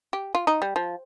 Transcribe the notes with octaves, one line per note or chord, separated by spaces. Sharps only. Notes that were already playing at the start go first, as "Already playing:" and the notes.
G4
F4
D#4
G3
F3